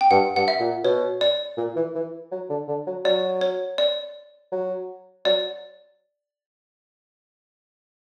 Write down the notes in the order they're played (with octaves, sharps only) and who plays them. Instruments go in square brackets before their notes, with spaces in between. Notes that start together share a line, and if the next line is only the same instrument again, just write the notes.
[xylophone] G5
[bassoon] G2 [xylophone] F#5
[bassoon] G2 [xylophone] F#5
[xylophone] E5
[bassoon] A#2
[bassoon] B2 [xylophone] C#5
[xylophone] D5
[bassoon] A#2
E3
E3
F#3
D3
D3
F#3
[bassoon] F#3 [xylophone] D5
[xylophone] C#5
D5
[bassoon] F#3
[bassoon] F#3 [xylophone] D5